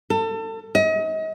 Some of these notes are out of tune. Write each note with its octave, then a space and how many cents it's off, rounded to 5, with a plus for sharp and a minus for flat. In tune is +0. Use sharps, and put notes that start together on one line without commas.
A4 +30
D#5 +35